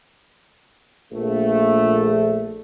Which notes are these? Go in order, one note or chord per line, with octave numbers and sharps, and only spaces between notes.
A#1 A3